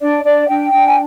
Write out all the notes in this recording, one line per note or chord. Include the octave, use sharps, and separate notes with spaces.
D4 D5
D4 D5
D4 G5
D4
G#5